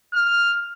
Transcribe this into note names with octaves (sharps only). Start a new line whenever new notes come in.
F6